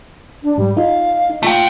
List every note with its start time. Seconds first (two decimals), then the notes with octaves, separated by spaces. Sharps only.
0.43 D4
0.58 G#2 G3
0.77 D#4 F4 F5
1.30 D#4
1.43 A3 F4 G5